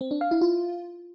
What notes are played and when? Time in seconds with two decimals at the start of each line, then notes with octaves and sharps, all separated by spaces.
0.01 C4
0.11 D4
0.21 F5
0.31 E4
0.41 F4